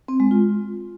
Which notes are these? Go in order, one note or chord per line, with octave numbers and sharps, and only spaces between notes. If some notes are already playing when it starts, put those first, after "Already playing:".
C4
G#3
F4